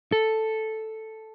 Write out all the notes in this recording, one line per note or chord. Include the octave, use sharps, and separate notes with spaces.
A4